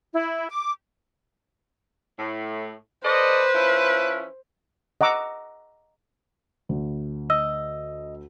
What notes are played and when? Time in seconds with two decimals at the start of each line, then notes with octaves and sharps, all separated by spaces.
0.13 E4
0.49 D6
2.19 A2
3.05 A4 B4 C5 D5 D#5
3.55 F3 C#4 E4
5.01 D#5 F#5 A#5 D6 E6
6.69 D2
7.30 D#5 E6